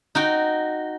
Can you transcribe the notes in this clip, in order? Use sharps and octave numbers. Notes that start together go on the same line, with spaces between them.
D#4 F#4 G5